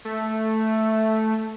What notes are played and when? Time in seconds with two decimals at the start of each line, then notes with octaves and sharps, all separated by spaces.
0.05 A3